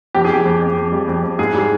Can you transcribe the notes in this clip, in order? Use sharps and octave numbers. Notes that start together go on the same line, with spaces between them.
F2 G4
G#4
F2 G4
F2
F2
F2
G3
F2
F2
G#2 G#4
G3 G#4